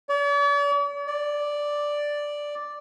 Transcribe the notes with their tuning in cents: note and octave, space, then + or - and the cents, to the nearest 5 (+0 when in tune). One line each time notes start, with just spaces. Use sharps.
D5 -45
D5 +0